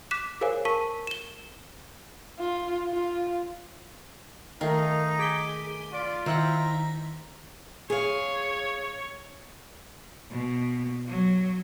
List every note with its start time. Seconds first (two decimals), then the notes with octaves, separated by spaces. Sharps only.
0.11 D6 F#6 B6 E7
0.41 G#4 A#4 C5 C#5 F5 G#5
0.65 A#4 A5 C#6 B6 D#7
1.07 E7 G7
2.39 F4
2.91 F4
4.61 D#3 A3 D#4 A#4 F5
5.19 G#4 D6 B6 G7
5.93 F4 D5
6.26 D#3 E4 C5 F#5 G5 A#5
7.90 G#4 C#5 F5
10.32 B2
11.08 F#3